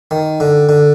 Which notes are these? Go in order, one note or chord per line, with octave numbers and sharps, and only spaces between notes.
D#3
D3
D3